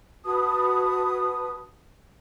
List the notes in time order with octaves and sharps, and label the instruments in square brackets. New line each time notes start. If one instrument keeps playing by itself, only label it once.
[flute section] F#4 B4 A5 D#6